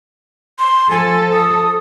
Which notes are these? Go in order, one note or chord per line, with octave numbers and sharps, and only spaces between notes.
C6
F3 A4 G#5
D#6